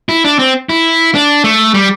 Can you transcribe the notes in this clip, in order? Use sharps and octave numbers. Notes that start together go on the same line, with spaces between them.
E4
D4
C4
E4
D4
A3
G3